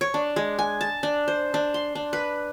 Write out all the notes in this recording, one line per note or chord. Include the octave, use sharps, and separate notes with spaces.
C#5
D4
G#3
G#5
A5
D4
C5
D4
C6
D4
B4